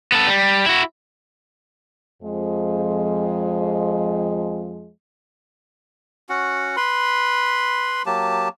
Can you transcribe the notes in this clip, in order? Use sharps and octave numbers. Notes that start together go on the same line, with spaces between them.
B3 A4
G3
E4 F#4
F2 F3 G#3
C#4 F#4 F#5
B4 B5 C6
F#3 A#3 G4 A5